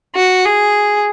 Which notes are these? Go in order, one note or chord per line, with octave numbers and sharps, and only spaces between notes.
F#4
G#4